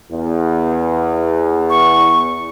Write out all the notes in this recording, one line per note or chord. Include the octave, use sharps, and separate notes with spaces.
E2
C#6